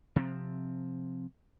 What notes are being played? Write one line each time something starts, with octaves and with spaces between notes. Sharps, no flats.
C3 F3 C4